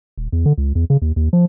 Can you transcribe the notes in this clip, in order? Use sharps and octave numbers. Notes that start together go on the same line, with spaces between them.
D#1
E2
D3
C#2
E2
C#3
D#2
D#2
F3